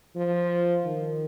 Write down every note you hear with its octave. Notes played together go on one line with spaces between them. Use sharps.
F3
D#3